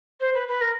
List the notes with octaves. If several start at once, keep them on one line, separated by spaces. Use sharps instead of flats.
C5
B4
B4
A#4